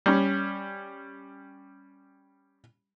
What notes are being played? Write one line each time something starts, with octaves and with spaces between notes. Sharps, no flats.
G3 C#4